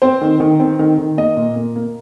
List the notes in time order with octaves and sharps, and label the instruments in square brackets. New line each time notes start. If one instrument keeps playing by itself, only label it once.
[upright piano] C4 C5
D#3
D#3
C4
D#3
D#3
A#3 D#5
A#2
A#3
A#3